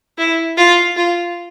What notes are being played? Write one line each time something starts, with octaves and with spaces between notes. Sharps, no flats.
E4
F4
F4